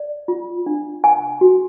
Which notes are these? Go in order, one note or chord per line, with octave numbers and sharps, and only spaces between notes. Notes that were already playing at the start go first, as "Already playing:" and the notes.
Already playing: D5
F4
D4
G#5
F#4